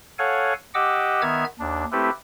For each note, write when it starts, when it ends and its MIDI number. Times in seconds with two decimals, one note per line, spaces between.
0.19 0.53 69
0.19 0.53 73
0.19 0.53 77
0.19 0.53 78
0.19 0.53 80
0.74 1.22 67
0.74 1.22 75
0.74 1.22 78
0.74 1.22 86
0.74 1.22 88
1.22 1.45 51
1.22 1.45 59
1.22 1.45 76
1.22 1.45 89
1.22 1.45 92
1.60 1.84 39
1.60 1.84 62
1.92 2.10 57
1.92 2.10 60
1.92 2.10 64
1.92 2.10 67
1.92 2.10 69
1.92 2.10 71